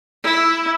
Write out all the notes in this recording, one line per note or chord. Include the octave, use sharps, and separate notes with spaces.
E4